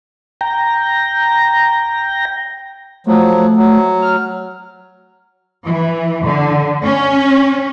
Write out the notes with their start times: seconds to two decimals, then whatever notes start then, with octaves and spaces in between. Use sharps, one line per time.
0.41 G5 A#5
3.07 F3 F#3 A3
3.57 F#3
4.02 F6
5.66 E3
6.25 D3
6.85 C#4